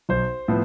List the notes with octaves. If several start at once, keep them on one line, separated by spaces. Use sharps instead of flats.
B1 C5
A2 F3 B3